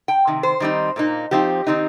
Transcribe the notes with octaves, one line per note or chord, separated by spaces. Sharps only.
G5
C3 D#3
C5
D#3 G3 C4 D#4
A#2 A#3 D#4
F3 C4 D#4 G4
D#3 C4 D#4